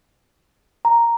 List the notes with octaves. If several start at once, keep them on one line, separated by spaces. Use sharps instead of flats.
A#5